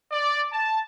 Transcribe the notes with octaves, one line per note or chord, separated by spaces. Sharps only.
D5
A5